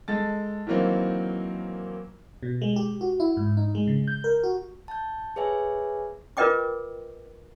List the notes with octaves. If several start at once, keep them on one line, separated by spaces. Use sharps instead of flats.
G#3 A4 A6
D#3 E3 F#3 A#3 C4
B2
G#3
G4
F#4
E4
G#2
D#4
G#3
C#3
G6
A#4
F#4
A5 G6
G#4 B4 C#5 E5 G#5
F4 A#4 B4 D#5 G5 D6